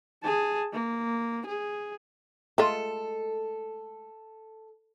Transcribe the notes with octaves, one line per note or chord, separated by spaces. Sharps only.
G#4 A5
A#3
G#4
G#3 A3 F4 A4